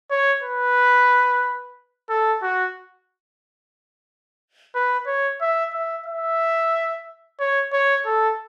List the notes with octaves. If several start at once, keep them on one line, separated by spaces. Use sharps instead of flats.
C#5
B4
A4
F#4
B4
C#5
E5
E5
E5
C#5
C#5
A4